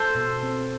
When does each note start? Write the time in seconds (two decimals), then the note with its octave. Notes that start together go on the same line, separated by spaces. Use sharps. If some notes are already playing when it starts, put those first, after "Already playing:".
Already playing: A4 C5
0.15 B2
0.43 C4